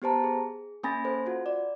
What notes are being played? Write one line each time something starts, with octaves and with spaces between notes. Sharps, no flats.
B3 G4 C5 A5 A#5
G#4
A#3 C#4 G#5 B5 A6 A#6
A4 C5
F4 F#4
D5